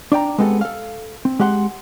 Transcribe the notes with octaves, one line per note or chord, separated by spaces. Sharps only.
D4 D5 G5 A#5
G#3 B3 C4 G4 A4
A4 F5
C4
G#3 G4 F#5 B5 C6